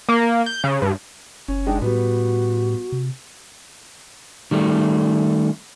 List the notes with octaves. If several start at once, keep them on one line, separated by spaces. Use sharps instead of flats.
A#3
G6
C#3
G2
F#1 C#4
G#3 D4 D#4 G5
A2 G3 B3 F#4
C3
D#3 G3 A3